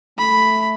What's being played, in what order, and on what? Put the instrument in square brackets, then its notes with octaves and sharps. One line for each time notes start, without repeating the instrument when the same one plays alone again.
[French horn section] A3 [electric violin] B5